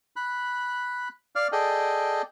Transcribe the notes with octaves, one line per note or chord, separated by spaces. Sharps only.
B5 F#6
D5 F5 F6
G#4 A4 D5 D#5 G5